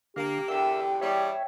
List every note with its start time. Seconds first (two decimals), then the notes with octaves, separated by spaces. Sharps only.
0.16 D3 A#3 G4 F5
0.48 E2 D3 A#4 E5 G5 E6
1.01 E2 G3 C#5 E5